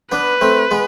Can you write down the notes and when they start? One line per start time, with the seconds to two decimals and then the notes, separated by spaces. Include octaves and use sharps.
0.12 B3 D4 B4
0.41 A3 C4
0.71 G#3 B3